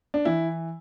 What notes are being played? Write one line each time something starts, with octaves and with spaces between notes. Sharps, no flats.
D4
E3 E4